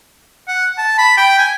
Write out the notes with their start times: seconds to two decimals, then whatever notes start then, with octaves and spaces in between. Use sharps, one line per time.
0.48 F#5
0.78 A5
0.98 B5
1.17 G5
1.39 G#5